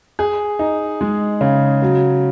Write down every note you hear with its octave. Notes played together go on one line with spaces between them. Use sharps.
G#4
D#4
G#3
C#3
F#3